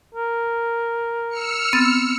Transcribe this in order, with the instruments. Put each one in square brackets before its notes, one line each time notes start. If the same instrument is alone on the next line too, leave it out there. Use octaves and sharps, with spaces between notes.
[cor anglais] A#4
[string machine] E6 F6 C#7
[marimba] B3 C4 A6